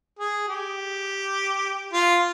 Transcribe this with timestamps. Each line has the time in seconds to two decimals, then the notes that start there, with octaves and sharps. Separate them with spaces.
0.19 G#4
0.48 G4
1.93 F4